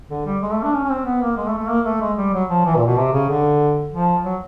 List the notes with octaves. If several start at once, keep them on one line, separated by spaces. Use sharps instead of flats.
D3
G3
G#3
A3
D4
C#4
C#4
C4
B3
A#3
G#3
A3
A3
A#3
A3
G#3
G3
F#3
F3
E3
A#2
B2
C3
C#3
D3
F3
F#3